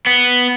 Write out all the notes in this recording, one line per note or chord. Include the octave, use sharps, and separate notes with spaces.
B3